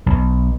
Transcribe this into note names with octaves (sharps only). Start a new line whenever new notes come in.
B1